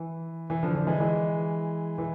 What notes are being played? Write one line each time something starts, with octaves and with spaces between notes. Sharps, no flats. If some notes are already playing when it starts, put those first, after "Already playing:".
Already playing: E3
E3
D3 F3
D3 F3
E3 G#3
E3 G#3
E3